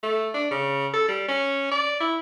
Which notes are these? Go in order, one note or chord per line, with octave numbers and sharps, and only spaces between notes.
A3
D4
C#3
A4
G3
C#4
D5
E4